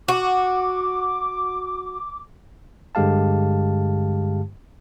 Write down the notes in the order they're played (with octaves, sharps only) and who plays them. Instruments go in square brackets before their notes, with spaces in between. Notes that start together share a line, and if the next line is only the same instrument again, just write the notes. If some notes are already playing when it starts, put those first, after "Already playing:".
[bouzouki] F#4 [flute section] D6
[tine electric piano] G2 D3 G#3 G4 F5 A5